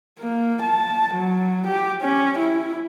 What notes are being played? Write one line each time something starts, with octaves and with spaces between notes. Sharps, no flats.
A#3
A5
F#3
G4
C#4
E4